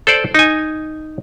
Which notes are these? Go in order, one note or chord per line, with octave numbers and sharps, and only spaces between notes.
A4 C5 D5
D#4 G#5